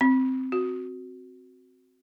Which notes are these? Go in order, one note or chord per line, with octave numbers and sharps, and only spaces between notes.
C4
F#4